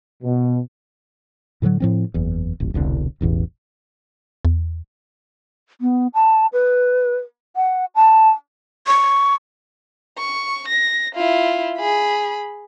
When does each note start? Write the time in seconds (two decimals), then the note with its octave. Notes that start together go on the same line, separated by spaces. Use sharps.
0.23 B2
1.62 A2 D3 E3 F#3
1.80 A2 F3 C4
2.14 F#1 E2
2.60 D#1 A1
2.74 E1 C2 A#2 D3
3.21 E1 A1 E2
4.45 E2
5.81 B3
6.14 A5
6.53 B4
7.56 F#5
7.95 A5
8.87 C#6
10.18 C#6
10.68 A#6
11.15 E4 F4
11.78 G#4 B5